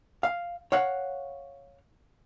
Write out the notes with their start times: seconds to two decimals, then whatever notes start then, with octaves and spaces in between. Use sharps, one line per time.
0.23 F5
0.72 C#5 F5 F#5